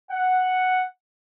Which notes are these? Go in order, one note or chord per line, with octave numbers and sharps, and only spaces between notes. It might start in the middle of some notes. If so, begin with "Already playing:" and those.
F#5